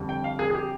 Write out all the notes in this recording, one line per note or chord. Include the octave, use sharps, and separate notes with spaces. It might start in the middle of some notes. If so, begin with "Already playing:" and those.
Already playing: F2 D3 G3
G5
F5
G#4
G#4
G4